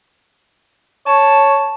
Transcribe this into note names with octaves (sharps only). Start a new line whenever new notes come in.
C#5 A5